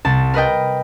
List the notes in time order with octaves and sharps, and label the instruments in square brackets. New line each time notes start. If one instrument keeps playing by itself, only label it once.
[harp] C2 A5
A#4 B4 D#5 G5